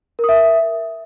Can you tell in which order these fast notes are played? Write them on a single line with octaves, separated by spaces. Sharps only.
A#4 D#6 E5